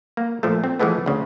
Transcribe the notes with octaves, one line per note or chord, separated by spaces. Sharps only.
A#3
A#2 F3 A3
C4
E3 F3 G#3 A3 B3
D2 C#3